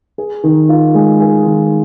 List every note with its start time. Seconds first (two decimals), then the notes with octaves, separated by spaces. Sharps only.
0.18 G#4
0.44 D#3
0.69 F4
0.95 G#3
1.20 G#4
1.46 D#3